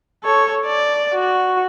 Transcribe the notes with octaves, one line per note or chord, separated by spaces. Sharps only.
A4 C#5
D5
F#4